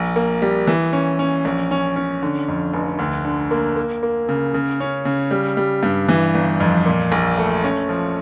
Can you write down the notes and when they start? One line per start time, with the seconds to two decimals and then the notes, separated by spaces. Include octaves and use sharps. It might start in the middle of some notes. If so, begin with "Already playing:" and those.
Already playing: A#1
0.16 A#3
0.42 G3
0.67 E3
0.93 C#4
1.19 C#4
1.45 A#1
1.71 C#4
1.96 C#4
2.22 D3
2.48 F2
2.74 F1
2.99 D2
3.25 D3
3.51 A#3
3.76 A#3
4.03 A#3
4.29 C#3
4.54 C#3
4.80 C#4
5.05 C#3
5.31 G3
5.57 G3
5.83 G2
6.09 E3
6.35 G1
6.60 F2
6.86 A#2
7.12 A#1
7.38 A3
7.64 C#4
7.89 F3